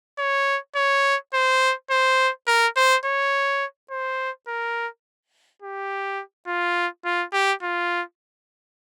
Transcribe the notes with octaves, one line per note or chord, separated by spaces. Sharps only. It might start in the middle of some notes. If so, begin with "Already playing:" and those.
C#5
C#5
C5
C5
A#4
C5
C#5
C5
A#4
G4
F4
F4
G4
F4